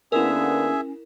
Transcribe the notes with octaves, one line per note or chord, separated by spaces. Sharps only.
D3 A#3 B3 C#4 E4 G#4 A#4 E5